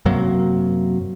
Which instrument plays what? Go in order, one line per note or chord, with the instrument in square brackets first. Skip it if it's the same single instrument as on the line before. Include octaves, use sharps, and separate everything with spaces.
[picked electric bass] F#2 C3 F#3 A#3